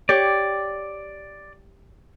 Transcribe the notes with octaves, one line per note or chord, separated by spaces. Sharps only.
G4 C#5 D5